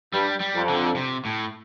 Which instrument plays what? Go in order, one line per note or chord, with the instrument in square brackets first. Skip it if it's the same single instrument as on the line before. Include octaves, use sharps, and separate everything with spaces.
[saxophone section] G2 [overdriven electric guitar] G3
[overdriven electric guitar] G3
[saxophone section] F2
[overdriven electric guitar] D3
C3
A2